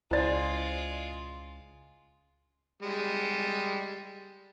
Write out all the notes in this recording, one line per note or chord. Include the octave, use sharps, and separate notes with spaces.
C#2 G#3 E4 F4 C5 D5 A6
G3 G#3